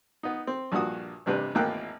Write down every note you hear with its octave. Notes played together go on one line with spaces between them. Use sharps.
B3 D#4
C4
A#1 G2 A#3 F#4 D#6
A1 G2 C3 D4 B4
G#1 E2 A2 A#3 G5 F#6